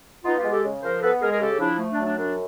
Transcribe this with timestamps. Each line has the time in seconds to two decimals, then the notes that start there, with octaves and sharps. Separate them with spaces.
0.24 B3 D#4 F4
0.37 F4 G4
0.44 G#3
0.51 G4 A4
0.64 C#3
0.82 F3 A#4 C5
1.02 B3 A4 B4
1.21 G#3 G#4 A#4
1.31 G#4 A#4
1.40 C#3 G4 A4
1.59 F3 D4 E4
1.79 A3
1.92 D4
1.98 F#3
2.05 D4
2.18 F#2 D4